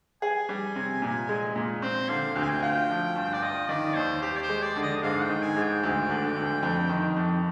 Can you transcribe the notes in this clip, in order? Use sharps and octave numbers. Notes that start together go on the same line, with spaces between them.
G#4 G#5
G3
C3
A#2
G#3
A#2
C4 C5
D3 F5
D2 G5
G#5
G5
F4 G5
F3
G2
D5
F4 D#5
D#3 D5
D#2 C5
G4 C5
D5
C5
G#3
D5
D3
D#5
D#5
G#2 F5
G5
D#3
G#5
G#2
G5
D2
D3
D2
F2
D#3
F2